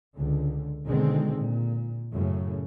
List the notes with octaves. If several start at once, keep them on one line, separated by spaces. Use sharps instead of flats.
C#2 D3
B2 D3 D#3 G#3 C4
A#2
F#2 A2 C#3